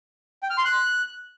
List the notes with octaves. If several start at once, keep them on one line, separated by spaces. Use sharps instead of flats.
G5
F6
C6
F#6